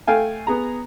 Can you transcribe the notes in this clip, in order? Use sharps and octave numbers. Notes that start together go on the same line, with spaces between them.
A3 F5 G5 G#5
B3 G#4 A#5